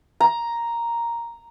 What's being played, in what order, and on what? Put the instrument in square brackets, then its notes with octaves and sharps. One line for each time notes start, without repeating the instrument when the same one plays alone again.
[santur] A#5